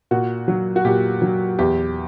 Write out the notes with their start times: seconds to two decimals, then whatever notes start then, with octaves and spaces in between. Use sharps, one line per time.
0.11 A#2 F#4
0.48 F#3
0.76 F#4
0.85 A#2 G4
1.22 F#3
1.59 E2 G4